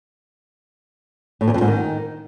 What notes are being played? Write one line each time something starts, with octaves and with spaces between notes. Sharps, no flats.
A2
E2
F2
G#2
D#3